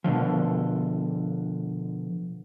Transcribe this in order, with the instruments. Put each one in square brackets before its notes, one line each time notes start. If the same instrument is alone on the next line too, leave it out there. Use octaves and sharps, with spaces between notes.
[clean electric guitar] B2 D3 D#3 F3